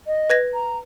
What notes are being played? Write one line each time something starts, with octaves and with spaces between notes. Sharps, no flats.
D#5
B4 G#6 A#6
A#5